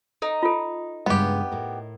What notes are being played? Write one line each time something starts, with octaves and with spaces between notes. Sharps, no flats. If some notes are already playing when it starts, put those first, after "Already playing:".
D#4 A4
F4 A4
G2 C#3 G#3 B3 G4
A2 A#4